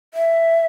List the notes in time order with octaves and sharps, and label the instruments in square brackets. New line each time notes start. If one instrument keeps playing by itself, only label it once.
[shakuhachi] E5